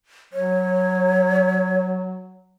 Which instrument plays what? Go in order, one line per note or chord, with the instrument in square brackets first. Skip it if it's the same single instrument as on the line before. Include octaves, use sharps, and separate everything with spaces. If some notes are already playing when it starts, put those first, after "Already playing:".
[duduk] F#3 [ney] C#5